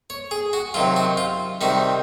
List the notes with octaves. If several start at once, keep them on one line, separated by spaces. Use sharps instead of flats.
C#5
G#4
F#4
C3 D#3 F#3 F4
F#4
F4
C3 D#3 G3 F#4